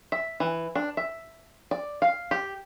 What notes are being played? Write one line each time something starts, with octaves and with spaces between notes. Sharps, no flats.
E5
E3
D4
E5
D5
F5
G4